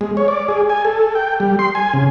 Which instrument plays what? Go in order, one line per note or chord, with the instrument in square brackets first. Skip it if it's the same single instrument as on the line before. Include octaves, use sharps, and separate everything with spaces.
[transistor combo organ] G#3
C#5
D5
G#4
G#5
A4
G5
G3
C6
G#5
C#3